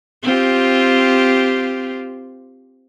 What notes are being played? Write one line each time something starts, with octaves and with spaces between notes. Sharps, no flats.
C4 F4 G4